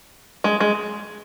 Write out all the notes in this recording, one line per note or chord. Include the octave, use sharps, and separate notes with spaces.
G#3
G#3